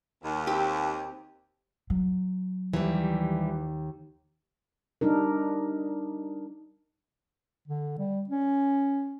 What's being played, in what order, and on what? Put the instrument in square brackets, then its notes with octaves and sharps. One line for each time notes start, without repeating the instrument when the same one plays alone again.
[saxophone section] D#2
[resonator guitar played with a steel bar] C4 G4
[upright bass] F#3
[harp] D#2 [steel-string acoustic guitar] E3 G3
[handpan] G3 D4 D#4 A#4
[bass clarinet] D3
G3
C#4